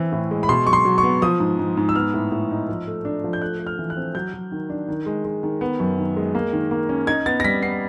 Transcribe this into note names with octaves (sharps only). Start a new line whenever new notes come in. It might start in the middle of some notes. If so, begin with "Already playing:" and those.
Already playing: E3 C4
A2
G#3
B5
B2 C6
F#3 C#6
C6
F#3
C#6
B3
F3 D#6
G#2
G#2
G#2
E6
B3 F6
A2
A2
D#4
F3
A3
D4
F3
G6
A3 F#6
A3
F6
E3
F#6
C4
F#3 G6
F#3
D#3
D4
D#3
G#3
G#3
D#3
B3
F#2
D#3
G#3
A#3
D#3
A#3
C#4
D#4 G#6
B3 A6
A#6
G3 B6
B3 C7